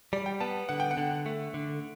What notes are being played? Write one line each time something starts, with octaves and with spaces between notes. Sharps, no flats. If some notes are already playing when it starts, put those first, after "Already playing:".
G3 D5
G5
B3 A5
D3 F#5
G5
F#5
D3
A3
D3